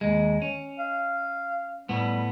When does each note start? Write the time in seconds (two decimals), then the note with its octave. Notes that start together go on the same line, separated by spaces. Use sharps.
0.01 D#2 G#3
0.42 C#4
0.79 F5
1.89 A2 G3 B3